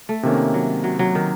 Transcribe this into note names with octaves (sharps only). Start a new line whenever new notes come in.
A3
C3 D#3 A#3 C#4
F#3
F#3
F#3
D#3